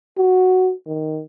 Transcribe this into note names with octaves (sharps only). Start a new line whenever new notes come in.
F#4
D#3